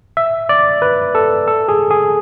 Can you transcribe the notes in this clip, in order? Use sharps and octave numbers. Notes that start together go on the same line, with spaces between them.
E5
D5
B4
A4
A4
G#4
G#4